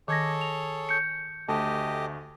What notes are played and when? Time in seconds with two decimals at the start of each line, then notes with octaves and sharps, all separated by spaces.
0.08 D#3 G#4 A4 C#5 D6 G#6 A#6
0.41 F7
0.89 G6 C#7
1.48 D2 A3 G4 D#5 A5